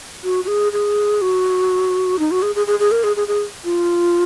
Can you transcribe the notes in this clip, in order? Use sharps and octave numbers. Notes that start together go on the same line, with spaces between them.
F#4
F#4
G#4
G#4
F#4
D#4
F#4
G#4
G#4
G#4
G#4
A#4
G#4
G#4
G#4
F4